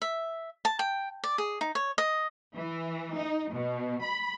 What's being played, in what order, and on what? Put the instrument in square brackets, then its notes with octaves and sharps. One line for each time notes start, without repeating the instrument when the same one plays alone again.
[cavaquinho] E5
A5
G5
D5
G#4
D#4
C#5
D#5
[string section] E3
D#4
B2
B5